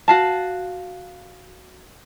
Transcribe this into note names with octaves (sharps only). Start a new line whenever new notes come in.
F#4 F5 A5